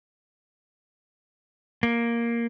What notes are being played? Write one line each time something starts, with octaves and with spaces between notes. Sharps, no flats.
A#3